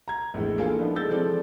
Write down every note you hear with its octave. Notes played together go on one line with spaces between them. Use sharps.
A#5 G#6
A#1 E2 A2 E3 G#3
A#3 D4 E4 F4 G#4 A4
F3 B3 D4 D#4
G#3 E4 A4 E6 G6 A6
E3 F3 G#3 C4 A4 D5